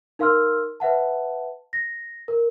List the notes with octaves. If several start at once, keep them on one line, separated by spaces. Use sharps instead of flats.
D#4 A#4 F5 C6 E6 F6
B4 E5 F#5 A5
A#6
A#4